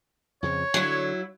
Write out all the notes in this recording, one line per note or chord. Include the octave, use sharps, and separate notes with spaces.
F2 C#3 F3 C#5
D3 F#3 E4